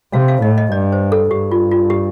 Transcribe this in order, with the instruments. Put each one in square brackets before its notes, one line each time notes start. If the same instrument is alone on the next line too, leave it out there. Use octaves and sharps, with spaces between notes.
[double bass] C3 [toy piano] F5
[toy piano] F5
[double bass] A2 [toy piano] D#5
[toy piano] D#5
[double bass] G2 [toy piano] D5
[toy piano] C5
A4
[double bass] G2 [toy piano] G4
[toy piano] F4
F4
G4